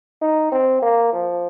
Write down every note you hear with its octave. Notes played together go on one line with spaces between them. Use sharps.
D#4
C4
A#3
F3